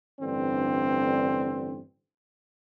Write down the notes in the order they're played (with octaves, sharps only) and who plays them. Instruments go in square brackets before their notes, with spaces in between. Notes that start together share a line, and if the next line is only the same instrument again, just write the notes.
[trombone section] A1 G2 D3 C4